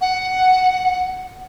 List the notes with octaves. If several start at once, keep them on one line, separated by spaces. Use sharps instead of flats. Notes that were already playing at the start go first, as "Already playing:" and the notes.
F#5